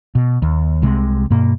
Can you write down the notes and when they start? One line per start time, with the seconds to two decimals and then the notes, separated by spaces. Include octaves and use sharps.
0.15 B2
0.42 D#2
0.82 C2 C3 G#3
1.30 G2 B2 A#3